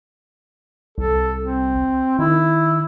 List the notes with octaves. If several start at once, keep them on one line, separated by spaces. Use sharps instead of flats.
C2 A4
C4
D#3 E4